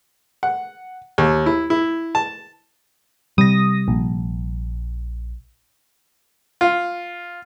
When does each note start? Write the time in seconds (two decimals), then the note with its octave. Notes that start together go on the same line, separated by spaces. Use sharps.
0.43 F#5
1.18 D#2
1.46 E4
1.70 E4
2.15 A5
3.38 C3 G3 D#6 A#6
3.88 A#1
6.61 F4